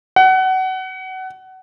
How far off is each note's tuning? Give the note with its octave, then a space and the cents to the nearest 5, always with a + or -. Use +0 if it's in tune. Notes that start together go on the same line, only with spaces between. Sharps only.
F#5 +25